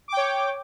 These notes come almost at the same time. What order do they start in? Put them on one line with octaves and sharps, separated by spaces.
D6 G5 C#5